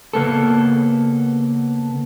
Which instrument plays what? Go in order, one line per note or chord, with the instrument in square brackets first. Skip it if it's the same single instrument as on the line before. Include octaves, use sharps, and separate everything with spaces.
[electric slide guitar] C#3 A#3 B3 A4